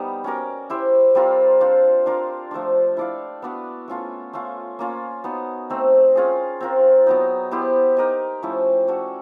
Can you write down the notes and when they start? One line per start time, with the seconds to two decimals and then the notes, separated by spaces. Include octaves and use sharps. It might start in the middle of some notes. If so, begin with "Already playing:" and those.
Already playing: G3 B3 D#4 G4
0.24 C#4 F#4 A#4 D5
0.70 E4 G4 C5 E5
1.15 G3 C4 F4 A#4
1.61 D4 F4 A4 C5
2.06 D4 F4 A#4
2.51 F3 A3 D4
2.97 E4 A4 D5 F5
3.42 B3 D4 F#4 B4
3.88 A3 C#4 F4 A4
4.33 A3 C#4 F4
4.79 A#3 C#4 F4
5.24 B3 D#4 F#4
5.70 A3 C4 D#4
6.15 C#4 F4 G#4
6.61 C4 F4 A#4
7.07 F#3 B3 D#4
7.51 B3 E4 G4 C5
7.97 D#4 G4 A#4 D#5
8.43 F3 A3 C#4 E4
8.87 C#4 F#4 A4 D5